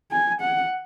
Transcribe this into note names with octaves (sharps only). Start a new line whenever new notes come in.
G#5
F#5